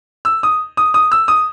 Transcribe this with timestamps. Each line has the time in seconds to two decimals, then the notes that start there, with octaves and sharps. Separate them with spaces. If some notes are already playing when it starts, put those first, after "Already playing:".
0.25 E6
0.43 D#6
0.77 D#6
0.94 D#6
1.12 E6
1.28 D#6